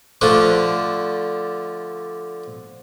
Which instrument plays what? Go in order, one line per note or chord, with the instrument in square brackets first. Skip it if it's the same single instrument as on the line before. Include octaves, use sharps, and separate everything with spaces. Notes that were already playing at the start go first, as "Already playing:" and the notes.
[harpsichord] D3 F3 A3 D4